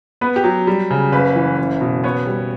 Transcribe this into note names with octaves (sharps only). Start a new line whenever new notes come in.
B3 B4
G4
F#3
G3
C#3
F#1 B4
E3
F#1
B2
B3 C#5
G3